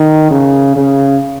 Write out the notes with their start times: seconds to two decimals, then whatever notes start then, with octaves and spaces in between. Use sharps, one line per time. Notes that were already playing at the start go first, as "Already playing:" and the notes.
Already playing: D#3
0.31 C#3
0.76 C#3